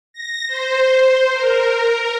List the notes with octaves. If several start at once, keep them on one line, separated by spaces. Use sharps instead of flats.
A#6
C5
A#4